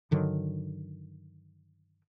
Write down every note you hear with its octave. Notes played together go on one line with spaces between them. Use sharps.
G2 D3 D#3 F#3